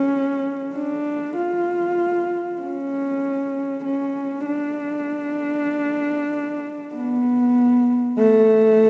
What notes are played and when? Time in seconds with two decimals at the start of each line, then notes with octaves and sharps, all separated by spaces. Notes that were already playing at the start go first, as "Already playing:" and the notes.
Already playing: C#4
0.75 D4
1.36 F4
2.61 C#4
3.84 C#4
4.46 D4
6.94 B3
8.18 A3